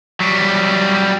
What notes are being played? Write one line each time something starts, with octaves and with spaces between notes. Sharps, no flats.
F#3 G3